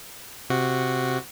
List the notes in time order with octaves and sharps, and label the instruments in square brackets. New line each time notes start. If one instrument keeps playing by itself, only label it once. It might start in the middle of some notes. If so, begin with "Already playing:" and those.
[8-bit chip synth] C3 F#4